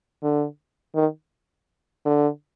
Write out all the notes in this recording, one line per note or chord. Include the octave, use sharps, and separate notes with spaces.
D3
D#3
D3